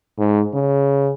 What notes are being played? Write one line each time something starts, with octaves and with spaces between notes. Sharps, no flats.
G#2
C#3